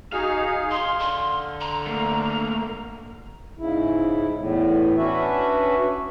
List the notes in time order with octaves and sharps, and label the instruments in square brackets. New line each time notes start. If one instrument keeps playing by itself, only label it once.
[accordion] D#4 G#4 [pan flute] F#4 [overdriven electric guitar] F5
[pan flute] C6
[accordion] D3 [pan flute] C6
[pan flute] A#5
[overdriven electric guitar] A3 A#3
[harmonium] G#2 C#3 E4
E2 A2
C#4 D4 F#4 B4 E5